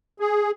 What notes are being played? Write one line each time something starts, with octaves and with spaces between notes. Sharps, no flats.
G#4